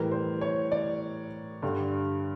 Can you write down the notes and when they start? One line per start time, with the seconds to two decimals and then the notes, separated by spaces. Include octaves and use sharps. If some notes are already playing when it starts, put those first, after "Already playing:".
Already playing: A2 E3 G3 A#4
0.12 C5
0.41 C#5
0.72 D5
1.62 G2 D3 G3